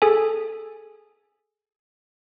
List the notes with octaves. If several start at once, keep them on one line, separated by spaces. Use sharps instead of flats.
G#4 A4 G#5